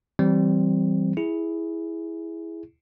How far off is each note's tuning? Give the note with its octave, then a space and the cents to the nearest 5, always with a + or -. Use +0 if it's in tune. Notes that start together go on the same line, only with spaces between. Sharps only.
E3 +0 G3 -20 C4 +0
E4 +0 G#4 +0